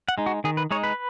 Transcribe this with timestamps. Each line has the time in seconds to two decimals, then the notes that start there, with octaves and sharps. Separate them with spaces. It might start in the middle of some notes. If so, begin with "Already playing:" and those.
0.08 F#5
0.18 G#3 D#4
0.26 F#4
0.44 D#3 G#4
0.57 B4
0.71 G#3 D#4 C#5
0.84 B4